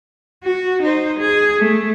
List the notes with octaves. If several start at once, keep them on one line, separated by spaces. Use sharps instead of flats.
F#4
D#4 C5
G#4
A3